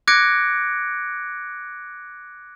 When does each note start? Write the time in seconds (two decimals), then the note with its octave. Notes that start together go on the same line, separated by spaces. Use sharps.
0.08 D6 F#6 G#6 A#6 C#7 D7